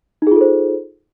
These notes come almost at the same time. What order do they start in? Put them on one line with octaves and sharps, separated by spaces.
D#4 G#4 F4 A4 C5